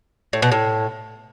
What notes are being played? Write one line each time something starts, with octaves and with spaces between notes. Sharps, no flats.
A2
B2
A2